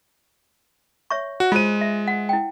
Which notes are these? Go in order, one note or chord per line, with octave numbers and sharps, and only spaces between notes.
C#5 E5 C#6
F#4
G#3 F4 C5 D#7
E5
F#5
E4 G5